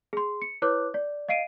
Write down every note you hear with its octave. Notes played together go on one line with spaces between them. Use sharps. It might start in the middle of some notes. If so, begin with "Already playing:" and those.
G#4 C6
C#7
E4 B4 C#5 D6 F#6
D5
D#5 F5 C7 D7 D#7